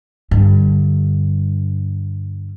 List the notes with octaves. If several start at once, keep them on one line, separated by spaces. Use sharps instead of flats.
G2 D3